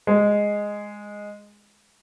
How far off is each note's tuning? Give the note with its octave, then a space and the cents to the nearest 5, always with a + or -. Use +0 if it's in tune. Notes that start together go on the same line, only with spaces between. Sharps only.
G#3 -5